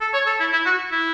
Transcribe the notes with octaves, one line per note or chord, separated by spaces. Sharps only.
A4
C#5
A4
E4
E4
F#4
E4